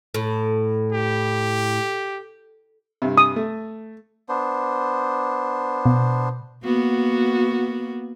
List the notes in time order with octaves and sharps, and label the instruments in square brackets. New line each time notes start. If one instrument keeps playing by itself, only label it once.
[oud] A2
[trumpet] G4
[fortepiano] G2 C3
[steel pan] D#6
[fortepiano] A3
[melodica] B3 D4 C5
[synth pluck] B2
[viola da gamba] A#3 B3 F#4